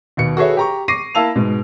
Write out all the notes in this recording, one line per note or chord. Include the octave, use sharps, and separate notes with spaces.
D#2 B2 C#7
F#4 G#4 A4 B4 C#5 E5
G4 A#5 C#6
C#6 D6 A#6 C7 D#7
A#3 E4 F5 A5 E6 F7
G#2 B2